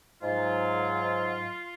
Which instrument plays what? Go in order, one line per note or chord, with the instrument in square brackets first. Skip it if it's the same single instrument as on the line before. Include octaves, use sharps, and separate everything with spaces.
[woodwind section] G#2 F#3 F4